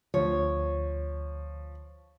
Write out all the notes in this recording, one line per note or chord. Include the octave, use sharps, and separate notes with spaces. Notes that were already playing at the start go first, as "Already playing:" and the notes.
D2 F3 C#5